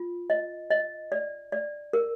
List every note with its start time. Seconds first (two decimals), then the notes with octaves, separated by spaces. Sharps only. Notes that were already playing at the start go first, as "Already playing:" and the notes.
Already playing: F4
0.30 D#5
0.71 D#5
1.12 D5
1.52 D5
1.93 A#4